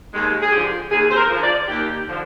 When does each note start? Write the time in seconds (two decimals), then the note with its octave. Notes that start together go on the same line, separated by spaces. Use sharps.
0.14 D#2 G#3
0.42 G#4
0.52 D3 F3 G4
0.90 D#2 G#4
1.10 C5
1.16 A#4
1.29 D3 F3
1.42 D5
1.68 D#2 G4
2.07 D3 F3